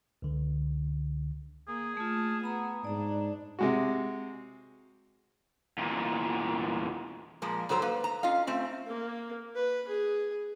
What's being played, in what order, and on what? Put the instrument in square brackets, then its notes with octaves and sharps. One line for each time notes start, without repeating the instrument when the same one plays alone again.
[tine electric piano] C#2 D3
[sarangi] A#3 [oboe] G#4
[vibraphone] A3 F4 [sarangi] A5
[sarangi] B3 [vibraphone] A#5 B5
[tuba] G#2 [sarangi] D4 [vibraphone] D5 A#5
[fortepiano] C3 G#3 F#4
[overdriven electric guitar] E2 A#2
[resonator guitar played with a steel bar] A#2 F3 G#3 A#3
G#2 F#3 A4 C5 A#5
A#3 B4
A#5
C#4 F4 D#5 F5
A3 C4 C#4
[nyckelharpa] A#3
B4
G#4